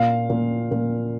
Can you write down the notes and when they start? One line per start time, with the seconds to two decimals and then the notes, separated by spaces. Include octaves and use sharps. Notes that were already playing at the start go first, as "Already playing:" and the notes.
Already playing: A#2 F5
0.30 A#2
0.71 A#2